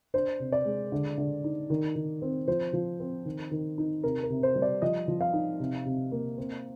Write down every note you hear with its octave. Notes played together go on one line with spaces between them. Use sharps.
D4 C5
C3
D5
G#3
D3
D3
D#4
D#3
D#3
C4
F3 C5
F3
C4
D#3
D#3
D#4
C3 A#4
A#4
C3
C5
G3
D5
F3 D#5
F3
F5
D#4
C3
C3
A#3
C4